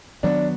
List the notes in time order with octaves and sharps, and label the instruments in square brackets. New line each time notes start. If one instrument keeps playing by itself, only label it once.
[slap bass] D#3 F#3 B3 [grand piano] D4